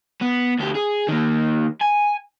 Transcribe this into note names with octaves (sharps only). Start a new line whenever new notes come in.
B3
D2 G4
G#4
D#3 A#3
G#5